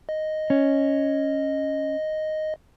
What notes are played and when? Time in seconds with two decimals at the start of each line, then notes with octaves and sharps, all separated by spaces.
0.09 D#5
0.50 C#4